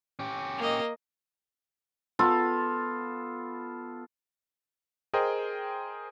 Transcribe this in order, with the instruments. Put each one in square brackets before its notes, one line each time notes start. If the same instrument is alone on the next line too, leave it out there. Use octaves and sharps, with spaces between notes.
[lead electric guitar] C#4 G4
[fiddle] A#3 D#5
[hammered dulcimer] B3 F4 A4
[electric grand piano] G#4 A#4 C5 D#5 G5